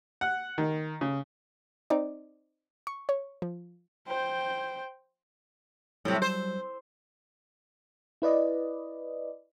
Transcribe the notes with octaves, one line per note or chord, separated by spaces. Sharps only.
F#5
D#3
C#3
C4 D#4 D5
C#6
C#5
F3
C5 G5
A2 C3 F#3 G3
C5
E4 B4 D5 D#5